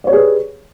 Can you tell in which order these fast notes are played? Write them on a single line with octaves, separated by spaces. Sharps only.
D5 C#5 G4 G#4 B4